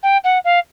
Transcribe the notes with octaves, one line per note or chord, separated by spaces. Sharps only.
G5
F#5
F5